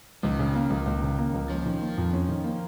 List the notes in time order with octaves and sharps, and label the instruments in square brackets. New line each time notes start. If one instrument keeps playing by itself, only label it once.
[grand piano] C#2 [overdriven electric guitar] D#3
[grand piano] C#3
A#3
C#2
C#2
C#3
A#3
C#2
[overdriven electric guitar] F3 [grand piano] C#4
[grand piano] D#3
A#3
F2
C#4
D#3
A#3